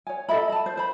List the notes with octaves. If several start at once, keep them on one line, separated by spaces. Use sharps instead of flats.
C#5 G#5
A4 D#5 E5 B5
A5 B5
C5
C5 B5